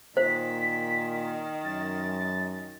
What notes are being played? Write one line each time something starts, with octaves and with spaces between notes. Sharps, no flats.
A#2 D#3 C5 B6
F#2 A6